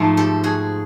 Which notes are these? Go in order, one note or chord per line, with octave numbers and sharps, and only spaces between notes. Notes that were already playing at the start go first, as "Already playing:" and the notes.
Already playing: G#2 F3 A3
G4 A4
F#4 G#4